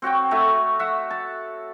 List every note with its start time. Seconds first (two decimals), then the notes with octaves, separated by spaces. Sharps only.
0.02 C4 F#4 C#5 G5
0.31 A3 F#4 C#5 E5
0.79 E5 F#5
1.11 A5